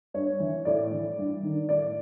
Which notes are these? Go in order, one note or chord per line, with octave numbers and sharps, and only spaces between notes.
G2 C#5
E3
A2 D5
E3
G2
D#3
A2 D5